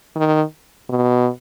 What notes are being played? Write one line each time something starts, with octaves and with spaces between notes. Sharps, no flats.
D#3
B2